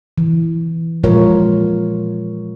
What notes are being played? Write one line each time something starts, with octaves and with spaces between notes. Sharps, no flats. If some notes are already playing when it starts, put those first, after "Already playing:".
E3
A#2 F3 G#3 F4 A#4 C#5